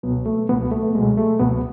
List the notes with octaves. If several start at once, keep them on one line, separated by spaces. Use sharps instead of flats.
C#2 B2 F#3 B3
A3
C#2 B2 F#3 B3
A3
C#2 B2 F#3 G#3
A3
C#2 B2 F#3 B3